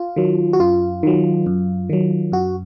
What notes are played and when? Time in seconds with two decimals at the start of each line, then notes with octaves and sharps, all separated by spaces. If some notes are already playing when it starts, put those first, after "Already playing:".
Already playing: F4
0.16 D#3 F#3
0.53 F#4
0.60 F#2 F4
1.03 D#3 F#3
1.46 F#2
1.90 D#3 F#3
2.32 F#2 F#4